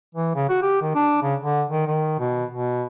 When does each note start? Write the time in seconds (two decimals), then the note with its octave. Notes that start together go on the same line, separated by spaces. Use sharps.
0.15 E3
0.35 C#3
0.50 F#4
0.62 G4
0.81 D#3
0.95 D4
1.22 C#3
1.42 D3
1.70 D#3
1.87 D#3
2.19 B2
2.51 B2